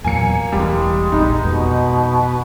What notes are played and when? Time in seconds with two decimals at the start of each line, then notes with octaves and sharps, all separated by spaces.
0.04 E2 A#2 F#3 A#3 G#5 C#7
0.52 E1 E2 E3 G3 G#3
1.12 F1 A#1 G3 D#4
1.43 F2 B2 G#3 B3